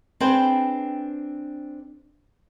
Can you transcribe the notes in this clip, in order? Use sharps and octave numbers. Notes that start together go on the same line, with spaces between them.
C4 D4 G#4 B4 C5 G5